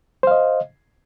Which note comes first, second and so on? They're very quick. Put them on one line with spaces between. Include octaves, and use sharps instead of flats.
C5 F5 D#5